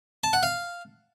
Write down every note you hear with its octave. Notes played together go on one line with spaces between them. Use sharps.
A5
F#5
F5